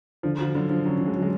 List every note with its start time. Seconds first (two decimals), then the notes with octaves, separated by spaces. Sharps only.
0.23 D3 F3
0.39 F3 F#4
0.55 D3 F#3
0.70 D3 F3
0.85 F#3 C#4
1.01 D3
1.06 G#3
1.16 F#3
1.22 G#3